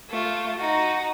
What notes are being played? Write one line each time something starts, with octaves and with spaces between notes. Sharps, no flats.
A3 F4
D#4 F#4